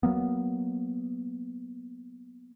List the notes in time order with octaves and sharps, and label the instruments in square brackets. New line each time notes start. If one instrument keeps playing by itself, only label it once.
[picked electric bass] F#3 A#3 B3